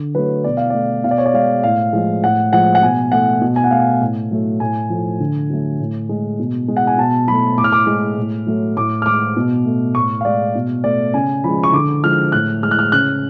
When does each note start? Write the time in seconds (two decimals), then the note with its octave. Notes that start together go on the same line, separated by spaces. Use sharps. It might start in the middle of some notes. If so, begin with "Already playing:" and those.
Already playing: D3
0.15 F#3 A3 B4
0.44 B2 D5
0.57 F5
0.70 A3 D5
1.04 B2 F5
1.11 D5
1.18 C#5
1.26 D5
1.34 G#3 F5
1.64 A2 F5
1.93 F3 G#3
2.24 A2 F#5
2.52 F3 G#3 F#5
2.75 F#5
2.82 B2 G#5
3.12 A3 F#5
3.41 B2
3.56 G#5
3.64 F#5
3.71 A3 F5
4.01 A2
4.31 F#3 A3
4.60 A2 G#5
4.90 F3 A3
5.20 D3
5.50 F#3 A3
5.80 A2
6.09 G#3
6.39 B2
6.68 G#3
6.77 F#5
6.87 G#5
6.98 B2 A5
7.28 F#3 B5
7.32 A3
7.58 A2 D6
7.64 F6
7.72 D6
7.87 G#3
8.18 A2
8.47 F#3 A3
8.77 A2 D6
9.02 F6
9.06 G#3 D6
9.36 B2
9.66 A3
9.95 A2 C#6
10.21 F5
10.25 G#3 D5
10.55 B2
10.84 A3 D5
11.14 C#3 G#5
11.44 F3 G#3 B5
11.63 C#6
11.73 D3 D6
12.04 F3 G#3 F6
12.32 A2 F#6
12.63 G#3 F6
12.71 F#6
12.79 F6
12.92 C#3 F#6